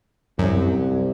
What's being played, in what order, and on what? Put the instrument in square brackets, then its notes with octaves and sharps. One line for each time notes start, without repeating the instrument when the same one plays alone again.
[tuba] C2 [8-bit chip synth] F#2